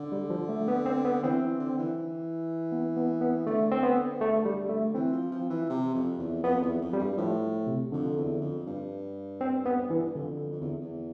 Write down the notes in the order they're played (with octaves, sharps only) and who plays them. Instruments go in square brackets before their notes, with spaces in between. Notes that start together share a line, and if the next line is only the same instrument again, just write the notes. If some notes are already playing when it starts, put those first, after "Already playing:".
Already playing: [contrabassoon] D3
[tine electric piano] G3
F3
A3
B3
C4
B3
[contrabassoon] E3 [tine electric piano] C4
[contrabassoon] E3
D3
E3
E3
[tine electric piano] B3
B3
B3
[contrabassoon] D3 [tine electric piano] A3
[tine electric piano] C4
B3
A3
G3
A3
[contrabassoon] E3 [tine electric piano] C4
[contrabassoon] F3
F3
E3
C3
F2
E2
[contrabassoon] F2 [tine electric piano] B3
[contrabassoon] E2
F2
[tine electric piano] G3
[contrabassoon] G2
[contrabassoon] A2 [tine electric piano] F3
[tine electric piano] C3
[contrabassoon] F2 [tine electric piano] D3
[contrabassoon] E2
F2
G2
[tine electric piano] C4
B3
E3
[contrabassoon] F2 [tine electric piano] D3
[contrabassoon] F2
E2
E2